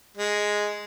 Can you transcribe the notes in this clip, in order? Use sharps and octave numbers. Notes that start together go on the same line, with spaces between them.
G#3